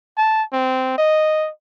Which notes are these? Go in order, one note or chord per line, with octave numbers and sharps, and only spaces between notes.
A5
C4
D#5